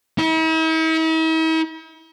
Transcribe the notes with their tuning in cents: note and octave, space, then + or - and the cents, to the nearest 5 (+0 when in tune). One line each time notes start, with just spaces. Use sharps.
E4 -45